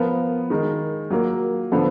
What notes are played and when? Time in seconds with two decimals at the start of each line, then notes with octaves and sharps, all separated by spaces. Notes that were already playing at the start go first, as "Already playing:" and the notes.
Already playing: F3 B3 F4 A#4
0.50 D#3 G#3 D#4 A#4
1.10 F#3 A#3 F4 A#4
1.72 D3 F3 B3